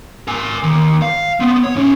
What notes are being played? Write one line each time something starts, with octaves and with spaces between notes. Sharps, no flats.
A#4 G#5
D#2
F5
B3 C4
C#5
A2 C#4